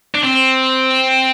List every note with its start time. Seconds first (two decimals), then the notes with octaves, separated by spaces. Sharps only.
0.15 D4
0.24 C4